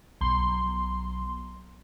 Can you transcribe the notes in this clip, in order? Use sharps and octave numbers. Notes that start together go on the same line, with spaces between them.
B1 C6